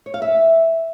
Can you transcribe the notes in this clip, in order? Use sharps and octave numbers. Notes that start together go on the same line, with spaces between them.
C#5
F5
E5